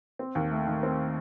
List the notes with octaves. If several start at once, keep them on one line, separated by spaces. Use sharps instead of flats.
C4
D#2
A3
D#3
C4